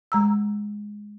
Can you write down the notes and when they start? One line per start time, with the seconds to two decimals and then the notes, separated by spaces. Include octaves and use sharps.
0.12 G#3 A#5 E6